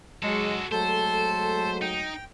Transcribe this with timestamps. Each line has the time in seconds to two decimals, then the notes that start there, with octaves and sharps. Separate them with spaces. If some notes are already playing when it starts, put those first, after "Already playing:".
0.23 F#3 G#3 F#4 A4
0.72 F#3 G#3 A3 A4 C5
1.82 D#4 G5